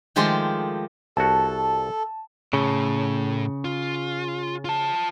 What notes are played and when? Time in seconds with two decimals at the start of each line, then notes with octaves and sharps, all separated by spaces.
0.16 D#3 F3 G#3 A3 G4 C6
1.17 C2 F#4 A4 A5
2.53 A2 C#3
3.65 F4
4.65 F4 A5